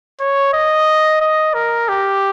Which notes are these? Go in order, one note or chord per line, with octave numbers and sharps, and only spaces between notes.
C#5
D#5
D#5
A#4
G4